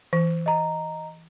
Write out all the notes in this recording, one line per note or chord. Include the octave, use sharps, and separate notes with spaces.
E3
D#5 A#5